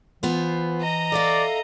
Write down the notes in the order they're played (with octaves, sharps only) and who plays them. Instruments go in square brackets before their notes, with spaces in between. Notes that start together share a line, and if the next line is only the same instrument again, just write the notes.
[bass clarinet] E3 [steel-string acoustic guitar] B3 F4 C5
[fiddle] D#5 A#5
[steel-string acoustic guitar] A4 E5 F5 [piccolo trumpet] D5